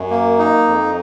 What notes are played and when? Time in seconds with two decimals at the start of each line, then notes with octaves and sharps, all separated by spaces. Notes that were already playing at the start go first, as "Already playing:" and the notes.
Already playing: F#2
0.10 A#3
0.38 D#4
0.67 F2